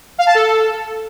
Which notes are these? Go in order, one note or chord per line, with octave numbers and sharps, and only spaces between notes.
F5
A5
A4